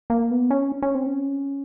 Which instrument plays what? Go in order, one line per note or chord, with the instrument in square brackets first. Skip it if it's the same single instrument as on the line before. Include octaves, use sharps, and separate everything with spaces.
[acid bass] A#3
B3
C#4
C#4
C4
C#4